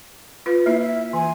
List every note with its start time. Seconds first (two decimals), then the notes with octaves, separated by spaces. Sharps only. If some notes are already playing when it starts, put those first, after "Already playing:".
0.46 F4 B4
0.66 A#3 E4 E5
0.82 E5
1.13 E3 G#5